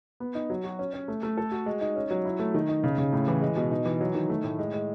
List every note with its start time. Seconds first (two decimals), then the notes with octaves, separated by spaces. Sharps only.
0.20 B3
0.35 D#4
0.50 F#3
0.64 F#4
0.79 C#4
0.94 C#4
1.08 A3
1.23 A3
1.38 A4
1.52 F#4
1.66 G#3
1.81 D#4
1.96 C#4
2.11 F#3
2.25 E4
2.39 A3
2.54 D#3
2.69 D#4
2.84 C#3
2.98 C#3
3.13 A2
3.28 E3
3.42 G#3
3.57 B2
3.71 D#4
3.85 E3
4.01 F#3
4.15 D#3
4.29 A3
4.44 A2
4.59 G#3
4.74 G#3